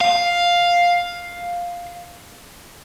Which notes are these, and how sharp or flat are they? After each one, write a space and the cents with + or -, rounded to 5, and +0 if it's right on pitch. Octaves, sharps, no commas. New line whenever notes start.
F5 +5